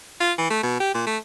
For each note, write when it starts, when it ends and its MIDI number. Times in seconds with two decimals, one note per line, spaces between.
0.20 0.32 65
0.38 0.49 52
0.50 0.60 57
0.63 0.77 47
0.80 0.92 67
0.94 1.03 46
1.07 1.17 57